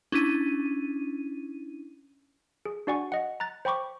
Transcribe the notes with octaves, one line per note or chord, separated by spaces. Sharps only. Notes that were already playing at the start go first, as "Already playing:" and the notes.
C#4 D4 E4 D#7
G#4
D4 F#4 D5 F#5 G#5 C#6
D#5 F#5
A#5 F#6 A6
C5 G5 B5 C#6 D6